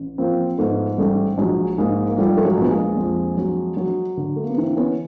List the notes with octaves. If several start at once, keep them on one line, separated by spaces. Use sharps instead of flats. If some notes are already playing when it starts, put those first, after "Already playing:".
Already playing: A1
F3 A#3 C4
G#2 A3 B3
A1 G3 A3
A#1 F#3 G#3
G#2 G#3 A#3
A#3
F3 G3 A3
A3
F#3 G#3
A#1 B3
G#3 A#3
F2
F#3
F#3
D3
A3
A#3
B3
E3 A#3 C4
B3 C#4